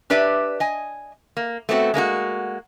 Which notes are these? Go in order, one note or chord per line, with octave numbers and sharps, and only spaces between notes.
D4 G4 B4 D5 E5
D#5 G#5
A#3
A3 B3 C4 F#4
G#3 A#3 D4 F#4